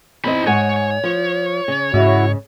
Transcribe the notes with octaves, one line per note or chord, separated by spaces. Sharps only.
E2 C4 D#4 D#5 B5
G#2 C#5 F#5 G#5
F3
C#3
G#2 C#3 E4 F#4